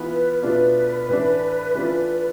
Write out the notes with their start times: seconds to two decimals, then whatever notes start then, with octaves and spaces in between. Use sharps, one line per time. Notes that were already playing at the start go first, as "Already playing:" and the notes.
Already playing: E3 B3 F4 B4
0.42 B2 A3 D4 F4 B4
1.09 A2 E3 A3 D4
1.74 E3 A3 D4 F4